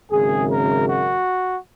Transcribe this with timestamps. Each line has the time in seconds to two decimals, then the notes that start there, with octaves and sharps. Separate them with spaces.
0.11 G#1 F#2 C#3 G#4
0.49 A#4
0.88 F#4